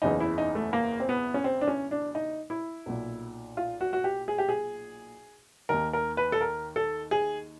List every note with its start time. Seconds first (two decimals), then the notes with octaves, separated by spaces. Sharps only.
0.02 F#1 E2 C#3 E3 D#4
0.20 E4
0.38 D#4
0.55 A3
0.73 A#3
1.00 C4
1.09 B3
1.34 C#4
1.44 C4
1.61 D4
1.67 C#4
1.91 D4
2.15 D#4
2.50 E4
2.86 B1 A#2
3.57 F4
3.81 F#4
3.93 F#4
4.04 G4
4.28 G#4
4.38 G4
4.49 G#4
5.69 D#2 D#3 A#4
5.93 A#4
6.17 B4
6.32 A4
6.41 A#4
6.76 A4
7.11 G#4